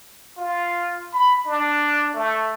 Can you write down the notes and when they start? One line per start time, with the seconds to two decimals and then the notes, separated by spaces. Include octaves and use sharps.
0.37 F4
1.14 B5
1.47 D4
2.14 A3